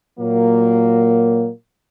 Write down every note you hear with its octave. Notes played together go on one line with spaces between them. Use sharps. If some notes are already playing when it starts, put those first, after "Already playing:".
A#2 F#3 A#3